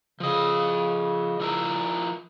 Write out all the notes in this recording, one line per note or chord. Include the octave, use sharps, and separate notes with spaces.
C#3 F3 D#5
F3 E4 A#4